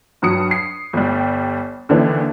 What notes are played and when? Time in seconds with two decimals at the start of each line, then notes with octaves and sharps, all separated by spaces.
0.22 G2 F#3 D#6 C#7
0.51 C7
0.93 G1 G3
1.89 D#2 D3 E3 D4